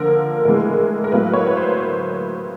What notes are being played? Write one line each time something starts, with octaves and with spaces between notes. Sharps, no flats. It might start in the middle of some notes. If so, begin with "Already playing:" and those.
Already playing: D3 F3 A#3 A#4
A2 E3 G#3 A#4
A#4
A2 F#3 A#3 B4
C#5
B4
C5